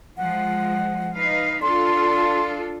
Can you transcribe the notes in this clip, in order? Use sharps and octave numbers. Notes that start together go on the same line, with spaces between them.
F3 G#3 F#5
D#4 B4 F5
D4 F4 A4 C6